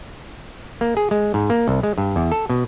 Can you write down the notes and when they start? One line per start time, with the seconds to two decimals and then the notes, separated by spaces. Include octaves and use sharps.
0.81 A#3
0.97 G#4
1.11 G#3
1.34 G#2
1.50 A#3
1.68 C2
1.83 G#3
1.98 G2
2.16 E2
2.32 A4
2.50 B2